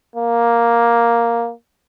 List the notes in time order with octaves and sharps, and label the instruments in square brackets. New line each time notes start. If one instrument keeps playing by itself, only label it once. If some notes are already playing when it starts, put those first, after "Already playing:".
[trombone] A#3